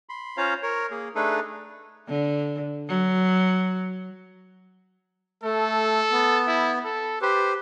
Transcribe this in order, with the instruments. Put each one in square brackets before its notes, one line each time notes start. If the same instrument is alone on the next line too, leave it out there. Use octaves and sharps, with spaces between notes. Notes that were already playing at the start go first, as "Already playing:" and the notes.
[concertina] B5 C6
C#4 F4 C5 C#5 F5 A#5
A#4 C#5
A#3 G#4
A3 D4 D#4 G#4 A4 B4
[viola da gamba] D3
F#3
[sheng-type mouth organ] A3 [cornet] A4
[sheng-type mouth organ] B3
[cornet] E4
A4
[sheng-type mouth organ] G4 B4 [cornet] C5